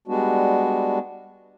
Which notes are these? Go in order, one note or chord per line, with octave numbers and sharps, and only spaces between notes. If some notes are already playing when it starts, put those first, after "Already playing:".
G3 G#3 B3 D4 F#4